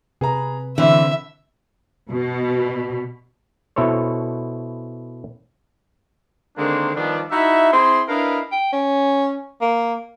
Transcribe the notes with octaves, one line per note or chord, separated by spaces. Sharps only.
C3 G#4 B4 A#5
D3 E3 C4 E5
B2
B2 E4 A4 C5 C#5
D3 D#3 G#3 A#3 C4 D4
D#3 F3 G3 B3 D4
D#4 E4 F#4 E5
C4 E4 G#4 C6
D4 E4 A#4 B4 D#5 F5
G5
C#4
A#3